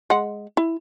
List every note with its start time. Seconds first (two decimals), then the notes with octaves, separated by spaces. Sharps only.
0.10 G#3 F#5
0.57 E4